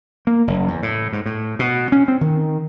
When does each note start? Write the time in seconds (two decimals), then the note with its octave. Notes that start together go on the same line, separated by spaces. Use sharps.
0.27 A#3
0.47 F#1
0.68 E2
0.83 A2
1.13 G#2
1.26 A2
1.59 B2
1.92 C#4
2.08 C4
2.21 D#3